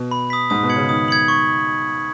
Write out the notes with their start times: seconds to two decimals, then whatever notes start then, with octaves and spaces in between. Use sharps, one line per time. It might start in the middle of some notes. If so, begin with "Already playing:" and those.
Already playing: B2
0.11 B5
0.30 D#6 B6
0.50 G#2 D#6
0.63 B2
0.69 G#6 C#7 F#7
0.76 C#3
0.89 D#3 D#6
1.08 G#6 C#7 F#7
1.28 C#6